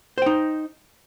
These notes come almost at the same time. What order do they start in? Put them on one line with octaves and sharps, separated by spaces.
C5 G5 D#4